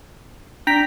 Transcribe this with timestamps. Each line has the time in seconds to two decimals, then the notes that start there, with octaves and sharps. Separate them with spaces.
0.67 D4 G5 A#5 B6